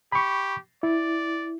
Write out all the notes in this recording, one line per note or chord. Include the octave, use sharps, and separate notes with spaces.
G4 B5 C#6
E4 D5